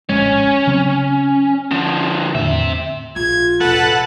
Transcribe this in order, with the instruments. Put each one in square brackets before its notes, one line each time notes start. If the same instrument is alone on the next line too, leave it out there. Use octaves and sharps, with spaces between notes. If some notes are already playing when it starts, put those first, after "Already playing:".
[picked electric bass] D1 A#1 G#3 [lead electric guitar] C#4
[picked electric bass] C#3 F#3 C4
[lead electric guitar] D3 F3 [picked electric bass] C#4
[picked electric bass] E2 A2 D3 [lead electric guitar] C4 E5
[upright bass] A#1 [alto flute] F4 [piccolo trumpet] G#6
[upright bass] E1 A1 [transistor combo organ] A4 F#5 [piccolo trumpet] B4